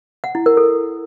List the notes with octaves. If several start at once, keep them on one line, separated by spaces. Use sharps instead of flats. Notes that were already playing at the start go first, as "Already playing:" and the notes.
F#5
E4
A#4
A4